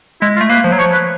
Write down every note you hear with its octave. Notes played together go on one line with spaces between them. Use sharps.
G#3 E4
F4
A3
A#3 B4
F3
F#3
F3 C#5
B4